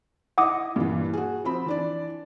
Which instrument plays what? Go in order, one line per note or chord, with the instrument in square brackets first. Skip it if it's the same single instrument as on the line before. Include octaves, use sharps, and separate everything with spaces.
[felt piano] E4 D#5 [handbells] F#5 D6 D#6
[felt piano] G2 A#2 E3
F#4 G#4
F3 C4 B5
E3 D4 D5